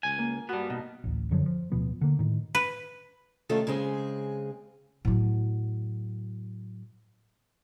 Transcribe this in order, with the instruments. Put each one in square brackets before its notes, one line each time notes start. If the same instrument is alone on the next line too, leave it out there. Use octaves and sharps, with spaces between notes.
[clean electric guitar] C#2 G#5
[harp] A#3
[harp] G2 F#4 [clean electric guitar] G3 B3
[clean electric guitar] B2 [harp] D#4
[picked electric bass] A1 D2
F#2 D3 F3 F#3
F3
D1 B2 F3 B3
D3 A#3
A2 D#3
[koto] B4
[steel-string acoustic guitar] C3 D#3 A3 C#4 F4 A4
C#3 G#3 C4 G#4
[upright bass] A2 F#3